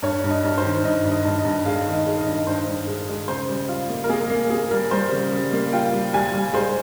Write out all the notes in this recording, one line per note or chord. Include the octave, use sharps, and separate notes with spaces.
G2 C#5
G2
D#5
G2
C5
D#3
G2 D#5
G2
D#5
G2
D#5
G2
G#3 F5
D#3
D#5
G#3
D#5
G2
G2 C5
G2
G#3
G#3
C#3 C5
G3
F4
A#3
A#4
A#3 G#4
A#3
A#3 G#4
G3 A#4
G3 C5
C#3
G3
A#3
F4 G5
G3
G3 G#5
G3
G#3 C5